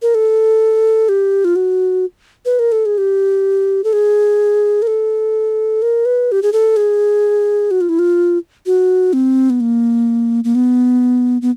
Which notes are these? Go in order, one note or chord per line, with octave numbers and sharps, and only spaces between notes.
A#4
A4
G4
F4
F#4
B4
A#4
A4
G#4
G4
A4
G#4
A#4
A4
A#4
B4
G4
G#4
A4
G#4
F#4
F4
E4
F4
F#4
C4
B3
A#3
A#3
B3
B3